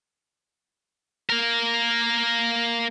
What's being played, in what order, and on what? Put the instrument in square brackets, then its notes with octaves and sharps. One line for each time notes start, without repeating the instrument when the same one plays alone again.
[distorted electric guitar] A#3 A#4